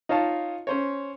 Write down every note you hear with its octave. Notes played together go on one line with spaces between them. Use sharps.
D#4 F4 C#5 F5 A5
C#4 C5 C#5